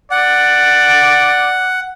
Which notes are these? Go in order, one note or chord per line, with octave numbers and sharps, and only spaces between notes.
D5 F#5